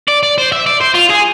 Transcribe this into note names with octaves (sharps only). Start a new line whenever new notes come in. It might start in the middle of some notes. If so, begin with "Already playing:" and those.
D5
D5
C5
E5
D5
C5
F4
G#4